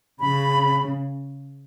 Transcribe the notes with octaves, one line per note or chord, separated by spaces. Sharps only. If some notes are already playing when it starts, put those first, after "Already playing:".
C#3 B5